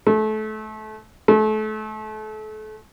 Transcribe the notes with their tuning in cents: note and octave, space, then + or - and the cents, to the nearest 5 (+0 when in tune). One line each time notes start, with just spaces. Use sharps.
A3 -25
A3 -30